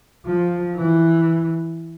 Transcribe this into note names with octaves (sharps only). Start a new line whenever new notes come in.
F3
E3